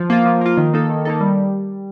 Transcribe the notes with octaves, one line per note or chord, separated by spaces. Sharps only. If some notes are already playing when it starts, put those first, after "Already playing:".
Already playing: F3
A#3 F4
F3
A#3 F4
D#3
A#3 D#4 A4
D#3
A#3 D#4 A4
G3